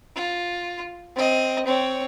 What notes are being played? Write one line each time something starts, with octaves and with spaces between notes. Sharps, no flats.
F4
C4 D#5
C4 C#5